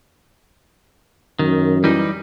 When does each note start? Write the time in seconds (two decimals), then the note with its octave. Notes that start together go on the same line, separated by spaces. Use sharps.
1.39 F#2 D#3
1.84 E3 G3 D#4